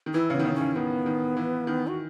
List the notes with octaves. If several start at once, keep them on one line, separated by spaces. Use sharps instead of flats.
D#3
E3 E4
C#3
D#3 B3
C#3
C#4
C#3
D#3 B3
D#3
E3
D#3
F#4